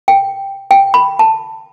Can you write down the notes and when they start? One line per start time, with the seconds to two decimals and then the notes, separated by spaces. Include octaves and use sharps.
0.08 G5
0.71 G5
0.94 B5
1.19 A5